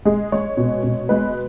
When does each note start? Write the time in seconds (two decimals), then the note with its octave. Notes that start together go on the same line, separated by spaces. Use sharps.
0.05 G#3 G#4
0.32 G#3 C#5
0.57 B2
0.83 B2
1.09 G#3 B4